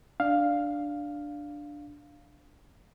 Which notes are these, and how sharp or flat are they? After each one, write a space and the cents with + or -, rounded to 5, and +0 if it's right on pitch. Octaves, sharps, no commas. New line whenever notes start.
D4 +0 F5 +0